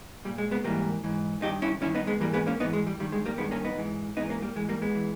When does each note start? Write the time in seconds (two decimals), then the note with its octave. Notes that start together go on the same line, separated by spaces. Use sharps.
0.25 A#2 G3
0.38 G#3
0.51 G#3 B3
0.64 G#2 E3 G3 A#3
1.04 G#2 E3
1.42 G2 D#3 D#4 G4
1.62 C#4 E4
1.81 G2 C#4 E4
1.86 D#3
1.95 B3 D#4
2.07 G#3 B3
2.20 G#2 E3 G3 A#3
2.33 G#3 B3
2.47 A#3 C#4
2.60 G#2 B3 D#4
2.63 E3
2.73 G#3
2.87 G3
2.99 G2 D#3 G3
3.12 G#3
3.26 G3 A#3
3.38 G2 D#3 G#3 B3
3.51 A#3 C#4
3.65 B3 D#4
3.77 G#2 E3
4.16 G#2 E3 B3 D#4
4.30 A#3 C#4
4.42 G3 A#3
4.56 G#2 E3 G#3
4.69 G3 A#3
4.82 G#3 B3
4.95 E3